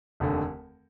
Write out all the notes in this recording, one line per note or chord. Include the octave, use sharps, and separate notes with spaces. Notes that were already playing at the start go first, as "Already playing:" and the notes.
F1 D#2 D3